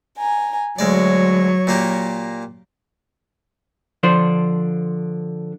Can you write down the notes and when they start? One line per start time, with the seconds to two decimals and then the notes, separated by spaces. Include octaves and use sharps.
0.17 G#5 A#5
0.79 D2 F#3 G#3 C#5 D5
1.67 A#2 A#3 G4
4.03 D3 F3 D4 C5